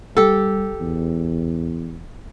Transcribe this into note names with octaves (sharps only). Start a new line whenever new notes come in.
G3 G4 A4
E2